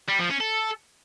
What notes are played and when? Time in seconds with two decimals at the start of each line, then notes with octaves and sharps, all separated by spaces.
0.08 G3
0.19 F3
0.30 C#4
0.40 A4